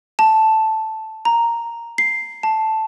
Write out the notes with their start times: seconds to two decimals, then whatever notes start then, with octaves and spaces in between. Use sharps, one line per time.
0.19 A5
1.25 A#5
1.98 C7
2.43 A5